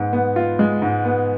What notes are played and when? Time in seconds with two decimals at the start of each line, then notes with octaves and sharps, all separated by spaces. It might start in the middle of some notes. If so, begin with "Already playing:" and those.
Already playing: G#2 G#3 B3
0.13 B3
0.36 F4
0.59 G#3
0.82 G#2
1.05 B3